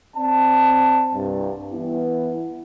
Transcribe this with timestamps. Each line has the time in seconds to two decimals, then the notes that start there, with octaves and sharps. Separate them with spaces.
0.16 C4 D5 A5
1.15 C2 G2
1.73 E3 B3 E4